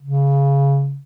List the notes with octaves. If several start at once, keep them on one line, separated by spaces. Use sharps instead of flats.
C#3